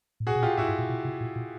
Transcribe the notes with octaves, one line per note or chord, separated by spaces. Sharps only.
A2
A#2 F#4 G#4
B2
A#2 F4 G4
A2 E4 F#4
G#2
A#2
B2
C3
A#2
A#2